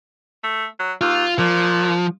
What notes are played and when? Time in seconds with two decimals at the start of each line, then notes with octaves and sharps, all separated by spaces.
0.43 A3
0.79 F#3
1.01 D#2 F4
1.39 A#2 F3